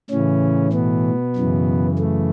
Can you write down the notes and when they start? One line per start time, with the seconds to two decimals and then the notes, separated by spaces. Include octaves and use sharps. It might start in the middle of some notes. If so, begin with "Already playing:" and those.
0.10 A2 C#3 E3 C#4
0.73 B2 B3
1.36 F#2 C#3 E3
1.99 A3